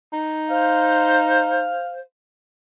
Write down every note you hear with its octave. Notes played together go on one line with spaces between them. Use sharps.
D#4
C5 F5